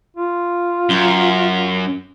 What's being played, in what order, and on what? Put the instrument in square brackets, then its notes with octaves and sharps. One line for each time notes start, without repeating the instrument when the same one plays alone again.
[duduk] F4
[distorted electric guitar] F#2